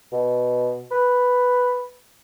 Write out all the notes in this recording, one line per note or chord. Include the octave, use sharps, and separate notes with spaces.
B2
B4